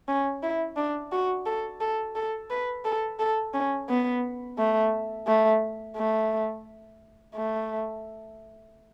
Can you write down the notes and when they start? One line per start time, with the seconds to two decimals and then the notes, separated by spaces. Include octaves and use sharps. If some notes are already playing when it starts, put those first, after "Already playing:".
0.08 C#4
0.43 E4
0.77 D4
1.12 F#4
1.46 A4
1.81 A4
2.15 A4
2.50 B4
2.85 A4
3.19 A4
3.54 C#4
3.89 B3
4.58 A3
5.27 A3
5.97 A3
7.35 A3